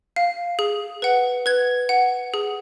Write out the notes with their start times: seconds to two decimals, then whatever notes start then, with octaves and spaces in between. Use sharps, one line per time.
0.16 F5
0.59 G#4
1.02 B4 F#5
1.46 B4 G#6
1.89 F#5
2.34 G#4